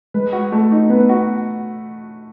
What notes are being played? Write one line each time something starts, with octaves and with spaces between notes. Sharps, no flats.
G#3 B4
F#4
A3
D#4
B3 B4
F#4